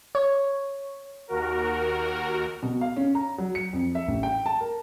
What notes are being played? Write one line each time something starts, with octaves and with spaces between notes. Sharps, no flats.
C#5
D#2 F#4 A#4
B2
F5
C#4
A#5
F#3
C#7
F2
E5
A1
G5
A5
A#4